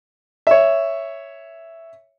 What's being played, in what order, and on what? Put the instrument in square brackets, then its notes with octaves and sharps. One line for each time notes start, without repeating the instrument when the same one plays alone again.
[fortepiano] C#5 E5